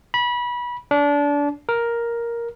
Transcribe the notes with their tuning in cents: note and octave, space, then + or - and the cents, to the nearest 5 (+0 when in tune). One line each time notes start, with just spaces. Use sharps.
B5 -25
D4 -25
A#4 +5